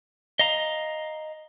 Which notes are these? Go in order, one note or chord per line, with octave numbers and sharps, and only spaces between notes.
D#5 F5 A#5